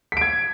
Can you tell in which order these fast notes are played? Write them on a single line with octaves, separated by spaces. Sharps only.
B6 D7 G#6